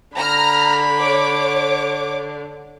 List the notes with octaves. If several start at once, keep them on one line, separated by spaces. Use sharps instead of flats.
D3 A#5 B5 F6
C#5 D6